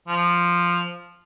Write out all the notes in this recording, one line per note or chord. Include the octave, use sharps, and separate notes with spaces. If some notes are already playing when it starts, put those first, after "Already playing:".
F3